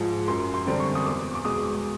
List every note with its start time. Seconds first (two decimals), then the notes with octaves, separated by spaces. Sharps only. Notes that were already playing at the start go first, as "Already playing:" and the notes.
Already playing: G#2 F3 G#3
0.28 F#2 C6
0.54 C6
0.67 D3 G3 C4
0.80 C#6
0.95 D#6
1.06 E2 D6
1.35 D6
1.45 B2 G#3 D#6